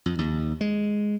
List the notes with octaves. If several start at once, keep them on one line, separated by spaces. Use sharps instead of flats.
F2
D#2
G#3